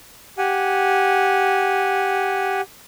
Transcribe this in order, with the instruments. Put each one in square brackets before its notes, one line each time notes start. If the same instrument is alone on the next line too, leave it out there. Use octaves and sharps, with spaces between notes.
[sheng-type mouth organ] G4 F#5 G#5